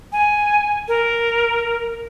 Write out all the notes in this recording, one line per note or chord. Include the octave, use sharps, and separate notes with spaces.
G#5
A#4